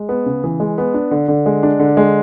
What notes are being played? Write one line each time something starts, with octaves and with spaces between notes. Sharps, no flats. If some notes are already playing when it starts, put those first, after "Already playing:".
Already playing: G#3
B3
C#3
E3
G#3
B3
D4
D3
D3
G#3
D4
D3
G#3